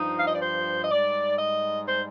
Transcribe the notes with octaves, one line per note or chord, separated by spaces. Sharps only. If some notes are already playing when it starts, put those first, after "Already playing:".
Already playing: G2 F3 D#4
F5
D#5
D5
C5
D#5
G#2 G3 D5
D#5
C5